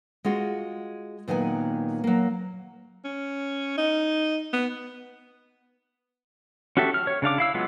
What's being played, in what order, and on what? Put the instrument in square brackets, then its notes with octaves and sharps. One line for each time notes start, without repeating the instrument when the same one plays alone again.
[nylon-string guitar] G#3 F4 F#4
A#2 D#3 F#3 B3 G#5
F#3 A#3
[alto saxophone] C#4
D#4
B3
[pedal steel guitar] C#4 F#4 G4 A4 E5
F6
C#5
C#3 D4 F5 D6
E4 F5 E6
F#3 G#3 B3 F4